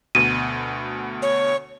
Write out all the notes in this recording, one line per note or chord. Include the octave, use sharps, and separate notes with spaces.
D2 B2 D#7
C#5